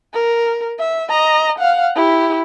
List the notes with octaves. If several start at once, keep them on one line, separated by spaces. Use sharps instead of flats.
A#4
E5
D#5 A#5
F5 F#5
E4 G4